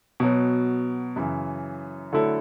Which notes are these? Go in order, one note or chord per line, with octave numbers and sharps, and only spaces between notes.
B2 F#3 B3
F#2 C#3 E3
D3 F#3 A3 E4 A4